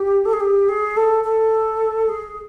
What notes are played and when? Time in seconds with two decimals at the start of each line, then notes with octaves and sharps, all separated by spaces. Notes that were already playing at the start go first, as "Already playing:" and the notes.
Already playing: G4
0.26 A4
0.33 G#4
0.40 G4
0.69 G#4
0.97 A4
1.24 A4
2.09 G#4